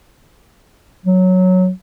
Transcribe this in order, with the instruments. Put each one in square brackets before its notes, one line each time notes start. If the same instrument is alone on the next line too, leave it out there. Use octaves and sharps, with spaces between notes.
[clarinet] F#3